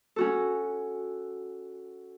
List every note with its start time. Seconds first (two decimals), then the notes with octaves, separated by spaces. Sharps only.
0.16 C#4 F#4 A4